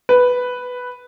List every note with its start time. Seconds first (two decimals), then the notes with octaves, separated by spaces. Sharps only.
0.09 B4